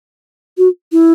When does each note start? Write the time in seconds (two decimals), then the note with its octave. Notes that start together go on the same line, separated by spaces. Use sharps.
0.58 F#4
0.92 E4